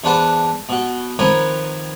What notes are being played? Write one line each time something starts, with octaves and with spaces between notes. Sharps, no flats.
E2 D4 B4 C5 F#5 A5
B2 F#4
D#3 F3 C4 A#4 B4 C#5